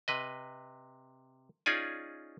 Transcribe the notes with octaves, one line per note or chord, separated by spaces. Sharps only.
C3 B4 D#5
C#4 D#4 F4 G#4 D5 G#5